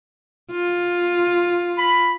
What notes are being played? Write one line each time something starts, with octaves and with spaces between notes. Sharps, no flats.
F4
B5